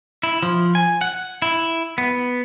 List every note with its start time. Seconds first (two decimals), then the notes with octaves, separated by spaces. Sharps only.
0.23 E4
0.43 F3
0.75 G#5
1.01 F#5
1.42 E4
1.98 B3